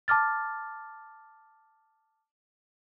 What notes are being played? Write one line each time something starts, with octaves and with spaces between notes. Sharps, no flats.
A5 D6 F6 A6